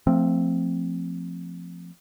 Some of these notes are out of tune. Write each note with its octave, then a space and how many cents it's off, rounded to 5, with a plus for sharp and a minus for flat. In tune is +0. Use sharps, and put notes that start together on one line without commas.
F3 +0 A3 +25 C4 +0